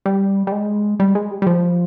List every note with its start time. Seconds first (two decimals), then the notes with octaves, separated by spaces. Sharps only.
0.06 G3
0.47 G3
0.52 G#3
1.00 G3
1.15 G#3
1.31 G3
1.42 G3
1.47 F3